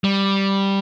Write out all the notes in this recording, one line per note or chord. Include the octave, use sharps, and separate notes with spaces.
G3